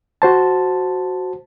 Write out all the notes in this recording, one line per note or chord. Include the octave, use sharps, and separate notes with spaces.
F#4 C5 A5